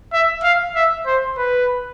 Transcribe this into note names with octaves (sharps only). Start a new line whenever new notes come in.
E5
F5
E5
C5
B4